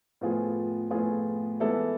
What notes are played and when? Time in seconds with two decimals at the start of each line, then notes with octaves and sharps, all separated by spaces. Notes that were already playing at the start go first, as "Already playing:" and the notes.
0.21 A2 F3 B3 F4 G#4
0.91 A2 F3 B3 F4 G#4
1.60 E3 G#3 B3 E4 A4